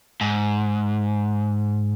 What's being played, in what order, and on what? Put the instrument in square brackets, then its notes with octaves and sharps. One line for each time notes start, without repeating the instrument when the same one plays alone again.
[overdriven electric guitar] G#2